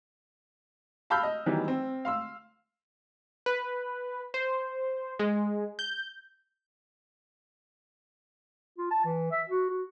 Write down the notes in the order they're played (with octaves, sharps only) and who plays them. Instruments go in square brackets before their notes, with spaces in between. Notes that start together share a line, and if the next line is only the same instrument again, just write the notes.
[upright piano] F5 A5 B5 E6 F6 G6
D#5
D#3 E3 F#3 G3 B3
C4
F5 C6 E6
[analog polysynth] B4
C5
G#3
G6
[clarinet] F4
A5
E3
E5
F#4
F#4